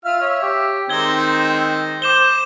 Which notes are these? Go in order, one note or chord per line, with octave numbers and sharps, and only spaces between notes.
F4 E5 F5 F6
C#5 E5
G4
D#3 G#3 C4 D#4 G#6 G7
C5 D6 E7 G7